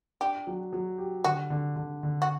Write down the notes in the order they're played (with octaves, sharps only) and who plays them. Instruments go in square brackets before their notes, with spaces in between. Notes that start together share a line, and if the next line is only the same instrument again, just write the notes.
[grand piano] D4 [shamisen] G4
[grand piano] F#3
F#3
G4
[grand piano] D3 [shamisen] F#4
[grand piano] D3
D3
D3
[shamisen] F#4